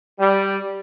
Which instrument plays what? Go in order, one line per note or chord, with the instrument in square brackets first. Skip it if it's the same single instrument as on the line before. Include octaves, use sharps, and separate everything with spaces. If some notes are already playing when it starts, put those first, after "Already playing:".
[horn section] G3